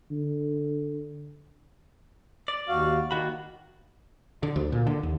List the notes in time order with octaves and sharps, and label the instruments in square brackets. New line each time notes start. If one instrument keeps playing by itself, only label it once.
[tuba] D3
[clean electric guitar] D5
[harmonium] D#2 F#4 F5
[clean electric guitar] D#3 F#4 B5 [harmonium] A#3
[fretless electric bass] D3
D2
A#2
D3
D#2